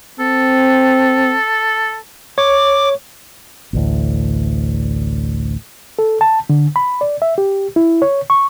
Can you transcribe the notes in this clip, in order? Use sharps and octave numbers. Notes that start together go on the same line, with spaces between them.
C4 A4
C#5 D6
A1 D2 A2
A4
A5
D3
B5
D5
E5
G4
E4
C#5
C#6